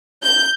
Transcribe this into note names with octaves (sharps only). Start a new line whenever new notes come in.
G6